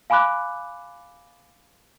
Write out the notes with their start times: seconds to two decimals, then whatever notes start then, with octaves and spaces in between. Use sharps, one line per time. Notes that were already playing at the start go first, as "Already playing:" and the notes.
0.10 F5 G#5 B5 D6 F#6